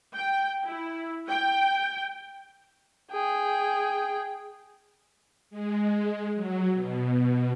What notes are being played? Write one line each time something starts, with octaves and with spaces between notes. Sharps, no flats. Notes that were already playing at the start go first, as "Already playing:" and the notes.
G5
E4
G5
G#4 G5
G#3
F#3
B2